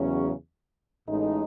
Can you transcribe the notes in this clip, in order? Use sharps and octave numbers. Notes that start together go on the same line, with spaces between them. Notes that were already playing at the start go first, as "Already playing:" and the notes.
Already playing: E2 C#3 F#3 C#4
A1 A2 G#3 D#4